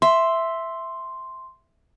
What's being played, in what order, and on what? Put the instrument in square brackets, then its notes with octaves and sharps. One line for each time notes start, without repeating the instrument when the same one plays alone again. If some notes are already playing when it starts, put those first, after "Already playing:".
[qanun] E5 [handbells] C6